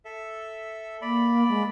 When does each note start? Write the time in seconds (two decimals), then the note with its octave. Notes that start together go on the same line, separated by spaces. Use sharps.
0.05 A4 E5
1.02 A#3 D5 B5
1.49 G#3